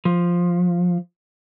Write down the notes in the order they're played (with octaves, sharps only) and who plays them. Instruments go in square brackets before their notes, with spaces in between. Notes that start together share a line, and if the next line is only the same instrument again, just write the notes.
[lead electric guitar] F3